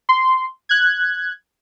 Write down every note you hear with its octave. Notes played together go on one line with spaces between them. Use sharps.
C6
F#6 G#6